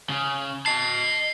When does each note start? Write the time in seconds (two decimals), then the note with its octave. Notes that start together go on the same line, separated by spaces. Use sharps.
0.09 C#3
0.66 D#5 A5 C7